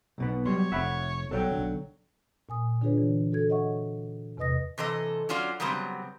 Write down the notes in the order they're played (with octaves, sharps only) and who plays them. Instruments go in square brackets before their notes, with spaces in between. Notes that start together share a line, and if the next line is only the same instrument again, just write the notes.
[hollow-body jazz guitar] B1 B2 B3
[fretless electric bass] B2 [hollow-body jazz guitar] F#3 G3 C6 [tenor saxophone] C#5
[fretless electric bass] F1 F2 [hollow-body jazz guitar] E5 F#5 B5
[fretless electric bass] B1 G3 [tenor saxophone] F#3 [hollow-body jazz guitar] A4 C#5 G5
[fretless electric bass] B1 D3
[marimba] A#2 G#5 D#6
D3 D4 F4 G#4 B4 C#5
E3
F#4 A4 G#6
C#5 D#5 E5 F#5 C#6
E2 C3 B4 D#5 D#6 A#6
[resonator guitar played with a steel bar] C3 E3 A4 D#5
F#3 C#4 F4 F#4 D5
C#3 F#3 G3 B3 C4